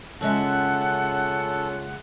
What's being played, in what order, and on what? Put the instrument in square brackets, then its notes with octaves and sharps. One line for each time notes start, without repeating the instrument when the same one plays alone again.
[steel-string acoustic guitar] C#3 G#3 E5 [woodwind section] C#4 F4 F#5 [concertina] A4